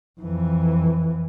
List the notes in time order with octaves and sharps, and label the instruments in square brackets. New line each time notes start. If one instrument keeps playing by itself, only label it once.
[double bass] F2 E3